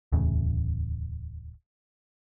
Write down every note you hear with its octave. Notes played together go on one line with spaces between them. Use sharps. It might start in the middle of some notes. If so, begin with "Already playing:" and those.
D1 E2 A2 C#3